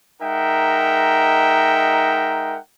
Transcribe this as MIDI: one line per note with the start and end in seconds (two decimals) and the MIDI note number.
0.22 2.58 56
0.22 2.58 63
0.22 2.58 70
0.22 2.58 76
0.22 2.58 78
0.22 2.58 79